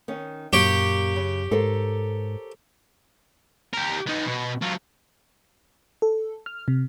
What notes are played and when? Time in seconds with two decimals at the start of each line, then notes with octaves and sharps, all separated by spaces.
0.08 D#3 C#4
0.53 F#2 A#2 G4 C#5
1.16 C#3
1.51 G#2 A4 A#4 C5
3.74 G4 A#4
4.07 B3 D#4
4.27 B2
4.62 F#3 F4
6.02 A4
6.46 F6
6.68 C3